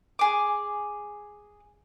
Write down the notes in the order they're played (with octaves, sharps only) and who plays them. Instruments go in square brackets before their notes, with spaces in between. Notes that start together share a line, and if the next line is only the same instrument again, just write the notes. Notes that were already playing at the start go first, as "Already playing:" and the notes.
[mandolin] G#4 D6